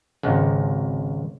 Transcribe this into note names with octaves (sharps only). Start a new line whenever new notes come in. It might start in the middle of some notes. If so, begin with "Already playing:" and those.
G#1 C#2 C3